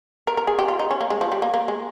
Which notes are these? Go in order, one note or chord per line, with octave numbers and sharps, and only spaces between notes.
A#4
A#4
G#4
G4
F4
D#4
C#4
A#3
G#3
F3
G3
A#3
A#3
G#3